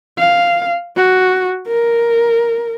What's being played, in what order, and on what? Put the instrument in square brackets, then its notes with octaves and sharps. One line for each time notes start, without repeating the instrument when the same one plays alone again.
[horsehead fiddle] F5
F#4
A#4